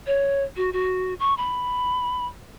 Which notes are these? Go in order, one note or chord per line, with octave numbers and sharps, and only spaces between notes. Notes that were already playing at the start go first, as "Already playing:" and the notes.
C#5
F#4
F#4
C#6
B5